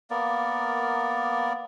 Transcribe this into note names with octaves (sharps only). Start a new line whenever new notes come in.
A#3 B3 A#4 D5